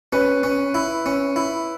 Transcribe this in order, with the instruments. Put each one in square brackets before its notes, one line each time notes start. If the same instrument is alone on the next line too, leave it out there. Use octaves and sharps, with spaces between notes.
[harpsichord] C#4 [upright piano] B4
[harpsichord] C#4
E4
C#4
E4